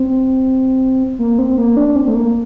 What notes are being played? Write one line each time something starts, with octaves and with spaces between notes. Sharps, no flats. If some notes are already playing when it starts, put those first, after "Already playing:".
Already playing: C4
A#3
C4
A#3
D4
C4
A3
A#3